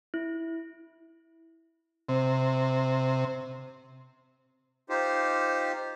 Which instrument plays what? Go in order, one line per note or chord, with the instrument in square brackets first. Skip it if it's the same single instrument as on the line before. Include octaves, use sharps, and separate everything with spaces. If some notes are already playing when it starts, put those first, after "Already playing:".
[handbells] E4
[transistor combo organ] C3
[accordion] D#4 F4 G4 C5